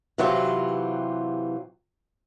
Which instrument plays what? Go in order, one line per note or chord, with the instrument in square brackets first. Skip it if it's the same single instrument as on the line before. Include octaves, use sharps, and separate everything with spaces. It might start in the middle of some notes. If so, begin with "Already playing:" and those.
[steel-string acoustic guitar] C3 E3 F#3 F4 G4